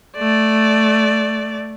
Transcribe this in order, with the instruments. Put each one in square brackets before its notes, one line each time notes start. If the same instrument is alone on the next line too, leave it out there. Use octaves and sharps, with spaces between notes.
[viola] A3 D5